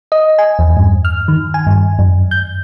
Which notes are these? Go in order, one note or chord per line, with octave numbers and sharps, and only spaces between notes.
D#5
G#5
E2
G2
F6
D#3
G#5
G2
F#2
G6